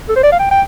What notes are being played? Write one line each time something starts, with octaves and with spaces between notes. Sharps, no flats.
A4
C5
D5
F5
G5
G5